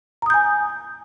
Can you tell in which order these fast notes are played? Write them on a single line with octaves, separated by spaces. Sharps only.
A#5 D#6 G6 G#5